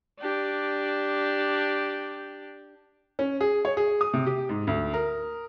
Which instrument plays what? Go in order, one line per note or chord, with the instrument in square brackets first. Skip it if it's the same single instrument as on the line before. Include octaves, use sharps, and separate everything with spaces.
[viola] D4 G4
[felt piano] C#4
G#4
C#5
G#4
D#6
C3
G4
G#2
D2
A#4